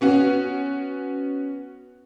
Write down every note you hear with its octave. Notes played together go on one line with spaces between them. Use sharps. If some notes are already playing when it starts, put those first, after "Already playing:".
B3 C#4 F#4